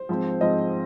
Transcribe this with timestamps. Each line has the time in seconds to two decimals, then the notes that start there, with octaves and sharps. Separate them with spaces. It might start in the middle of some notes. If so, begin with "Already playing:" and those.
Already playing: C5
0.09 G#2 F3 C4
0.41 G#2 F3 C4 D#5